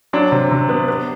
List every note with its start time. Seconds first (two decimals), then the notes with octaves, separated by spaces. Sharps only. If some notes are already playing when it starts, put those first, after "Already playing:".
0.13 F#3 D4
0.32 C3
0.51 C3
0.69 B3
0.88 B3